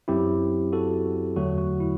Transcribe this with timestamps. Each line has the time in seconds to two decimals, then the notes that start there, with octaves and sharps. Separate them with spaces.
0.08 F#2 F#3 C4 E4 G4
0.73 F#4 A4
1.36 E2 D3 F#3 A3 F#4
1.58 F#4
1.80 E4